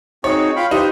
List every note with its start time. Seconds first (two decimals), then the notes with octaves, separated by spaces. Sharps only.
0.24 C4 D#4 F#4 G#4 C#5
0.56 F4 F5 G5 B5
0.71 D#4 G4 B4 C5